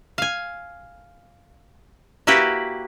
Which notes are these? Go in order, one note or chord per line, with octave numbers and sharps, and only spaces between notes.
F5 G#5
A#3 E4 F#4 G4 B4